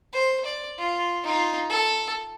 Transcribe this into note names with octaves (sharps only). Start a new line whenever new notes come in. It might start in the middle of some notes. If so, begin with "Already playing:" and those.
C5
D5
F4
D#4 F4
A4